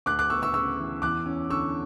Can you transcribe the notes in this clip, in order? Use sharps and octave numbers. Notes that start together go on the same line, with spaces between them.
D2 D6 F#6
D6 F#6
B3 C#6 E6
C#6 E6
C#3 C#6 E6
E3
E2 D6 F#6
C#4
D3 C#6 E6